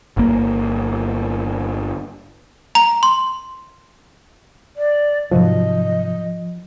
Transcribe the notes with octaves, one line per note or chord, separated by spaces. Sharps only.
G1 A#3
A#5
C6
D5
G#2 C3 F3 F#3 D#5